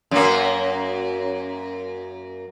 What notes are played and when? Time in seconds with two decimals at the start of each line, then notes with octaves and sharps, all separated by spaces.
0.11 F#2 A#3